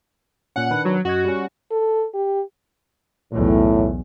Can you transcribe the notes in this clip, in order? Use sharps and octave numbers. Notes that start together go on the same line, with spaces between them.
A#2 C#4 F#5
D#3 D4 B4
F#3
F#2 F#4 D#5 G#6
G3 C#4
A4
G4
B1 E2 A2